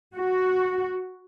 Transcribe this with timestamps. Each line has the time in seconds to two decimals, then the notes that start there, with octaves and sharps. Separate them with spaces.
0.15 F#4